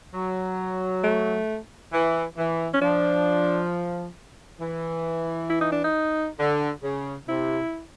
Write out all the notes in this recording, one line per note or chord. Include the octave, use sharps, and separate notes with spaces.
F#3
A3
E3
E3
C#4
F3 D4
E3
E4
D#4
D4
D#4
D3
C#3
C3 E4